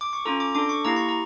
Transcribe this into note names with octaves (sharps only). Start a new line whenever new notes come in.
D6
C#6
C#4 F4 A4 A#5
D6
D4 A4 D6
C#6
A#3 E4 G4 A#5
C#6
A#5